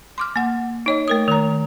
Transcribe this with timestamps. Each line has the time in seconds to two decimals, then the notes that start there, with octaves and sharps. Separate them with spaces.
0.18 C6 D6 F6
0.36 A#3 F#5
0.86 D#4 C#5 D#5
1.08 A3 A#4 D#6
1.28 D#3 A#5